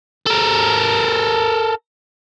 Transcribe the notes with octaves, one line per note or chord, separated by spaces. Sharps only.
A4 A#4